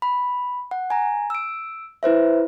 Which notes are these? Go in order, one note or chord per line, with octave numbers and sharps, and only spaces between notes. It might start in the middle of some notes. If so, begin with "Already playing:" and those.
B5
F#5
G#5 A#5
E6 D7
E4 B4 C5 E5